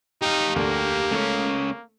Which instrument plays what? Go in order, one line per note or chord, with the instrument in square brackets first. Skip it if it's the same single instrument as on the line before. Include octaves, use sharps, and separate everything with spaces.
[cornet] D#4 [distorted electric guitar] G4 F5
[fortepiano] D2 [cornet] A#3
[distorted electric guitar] C#2 C#4 [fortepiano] A3